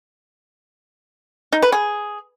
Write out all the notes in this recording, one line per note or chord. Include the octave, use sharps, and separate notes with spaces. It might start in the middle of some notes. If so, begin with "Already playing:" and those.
D#4
B4
G#4